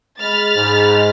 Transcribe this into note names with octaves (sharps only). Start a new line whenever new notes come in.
G#3 B5 F6 A6
G#2